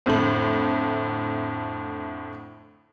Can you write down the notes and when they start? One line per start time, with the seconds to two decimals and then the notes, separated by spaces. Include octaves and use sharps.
0.06 F2 A2 D3 A3 F#7